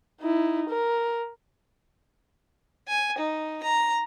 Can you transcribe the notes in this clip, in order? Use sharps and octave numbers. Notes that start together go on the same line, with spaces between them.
D#4 E4
A#4
G#5
D#4
A#5